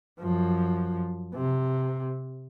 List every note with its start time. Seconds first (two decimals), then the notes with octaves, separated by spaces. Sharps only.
0.20 F#2 F3
1.35 C3